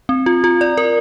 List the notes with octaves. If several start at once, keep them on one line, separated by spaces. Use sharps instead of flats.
C4
F4
F4
D5
A#4